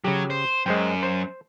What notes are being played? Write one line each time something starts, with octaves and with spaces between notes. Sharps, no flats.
C#3 F#3 G4
C5
F#2 G#3 C5 G5
C5